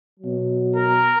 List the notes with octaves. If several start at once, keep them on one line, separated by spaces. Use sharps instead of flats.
B2 F#3
A#4